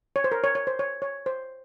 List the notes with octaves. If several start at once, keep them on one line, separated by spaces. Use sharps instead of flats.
C#5
C5
A#4
C#5
C#5
C5
C#5
C#5
C5